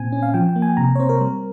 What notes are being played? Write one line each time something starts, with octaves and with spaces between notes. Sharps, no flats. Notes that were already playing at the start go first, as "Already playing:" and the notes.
Already playing: A#2 C4 G#5
C#4
F5
F3 G5
G5
A#3
G#5
C3 A#5
C#5
C4 C5
A#4
G3